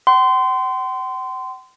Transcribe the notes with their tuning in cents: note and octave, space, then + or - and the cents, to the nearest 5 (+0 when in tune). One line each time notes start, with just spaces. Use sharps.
F#5 +45 C6 -25